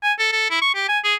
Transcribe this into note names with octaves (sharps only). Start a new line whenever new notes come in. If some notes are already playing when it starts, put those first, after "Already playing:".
G#5
A4
A4
E4
C#6
G4
G#5
G#4